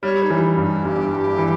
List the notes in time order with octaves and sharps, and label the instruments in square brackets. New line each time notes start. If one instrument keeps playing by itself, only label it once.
[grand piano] G3 [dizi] C#5
[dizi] D#4
[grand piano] E3
G2
[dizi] D#4
[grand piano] G1 [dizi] G4
[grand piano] G3
E3